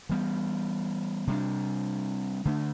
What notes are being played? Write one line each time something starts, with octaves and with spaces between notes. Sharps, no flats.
E3 G3 B3
C3 G3 D4
D3 A3 D4